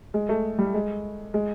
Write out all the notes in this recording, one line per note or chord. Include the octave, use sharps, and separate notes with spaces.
G#3
A3
G3
G#3
G#3